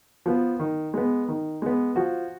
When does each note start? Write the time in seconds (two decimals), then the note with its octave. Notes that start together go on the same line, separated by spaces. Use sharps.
0.26 F3 B3
0.60 D#3
0.94 G#3 B3
1.28 D#3
1.62 G#3 B3
1.96 F3 F#4